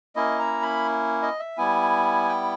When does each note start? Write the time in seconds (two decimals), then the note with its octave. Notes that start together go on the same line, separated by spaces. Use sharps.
0.15 A#3 C#4 E4 D#5
0.39 A#5
0.62 B5
1.22 D#5
1.39 E5
1.57 G3 B3 E4 G#5
2.29 G5